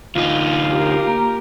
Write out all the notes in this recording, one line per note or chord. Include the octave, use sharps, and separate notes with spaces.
D2 D#4 F4
G4 A#4
A#3